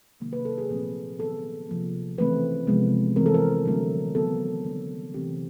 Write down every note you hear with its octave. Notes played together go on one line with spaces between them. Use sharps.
C3 D#3 F#3 A#3
B4
A4
G#4
A#2 F3 A3 C4
D#3 F#3 B3 A4
C3 F3 A#3
C#3 E3 A3 C4 B4
C3 F3 G#3 B3
E3 A3 C4 A#4
A4
A#4
D3 F#3 A3 C4
D#3 F#3 B3 A4
D3 G3 C4
C3 E3 A3 C4 G4